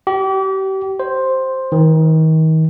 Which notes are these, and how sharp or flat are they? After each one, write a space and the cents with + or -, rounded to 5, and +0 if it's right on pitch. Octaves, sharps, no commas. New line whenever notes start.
G4 -35
C5 +5
D#3 +35